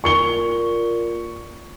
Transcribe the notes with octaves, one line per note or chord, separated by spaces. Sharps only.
A#2 C#6 C#7 G7